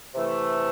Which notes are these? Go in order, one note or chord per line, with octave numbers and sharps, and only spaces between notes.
C3 E3 A3